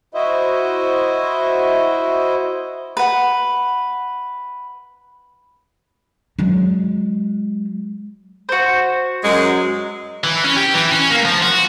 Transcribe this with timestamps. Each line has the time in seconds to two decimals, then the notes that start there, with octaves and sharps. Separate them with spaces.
0.14 E4 F#4 C5 D#5 E5
2.97 B4 F#5
6.39 F#3 G#3
8.49 F#4 C5
9.24 F#2 F#3 G#3
10.24 E3
10.44 C#4
10.56 G4
10.74 E3
10.91 C#4
11.10 A#3
11.25 F3
11.42 F#4